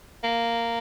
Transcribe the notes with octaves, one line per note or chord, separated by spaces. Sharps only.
A#3